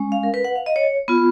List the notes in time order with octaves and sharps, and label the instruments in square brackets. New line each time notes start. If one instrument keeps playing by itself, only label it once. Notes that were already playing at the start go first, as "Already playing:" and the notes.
Already playing: [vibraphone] G#3 C#4
F5
A#4
B4
F#5
F5
D#5
C#5
B3 F4